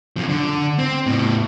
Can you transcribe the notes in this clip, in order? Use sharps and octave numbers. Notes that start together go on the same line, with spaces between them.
F#2 F3
D3
C4
A2 B3